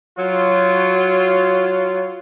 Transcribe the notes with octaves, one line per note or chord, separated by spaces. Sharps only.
F#3 F4